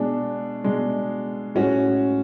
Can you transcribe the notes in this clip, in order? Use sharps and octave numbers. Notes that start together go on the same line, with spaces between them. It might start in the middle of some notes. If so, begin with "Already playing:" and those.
Already playing: B2 G#3 D4
B2 G#3 D4
A2 G#3 C#4 F#4